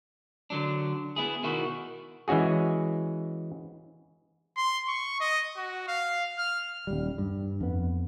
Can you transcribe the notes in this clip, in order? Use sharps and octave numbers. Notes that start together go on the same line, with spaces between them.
D3 F#3 D4
B3 E4 G#4
B2 D#3 E4 F#4
E3 G#3 C#4 F#4 G#4
C6
C#6
D#5
F#4
F5
F6
D#1 G3
G2
F2 B3